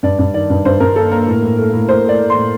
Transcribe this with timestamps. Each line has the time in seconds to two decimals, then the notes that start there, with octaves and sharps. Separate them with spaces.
0.03 G2 D5
0.19 G2
0.34 D#3 D5
0.50 G2
0.65 G2 C5
0.80 G2 A#4
0.96 A#3 A4
1.11 A#3 A#4
1.27 A2
1.42 A2
1.58 A3
1.73 A2
1.88 A2 C5
2.04 A3 D5
2.19 A3
2.30 C6
2.35 A2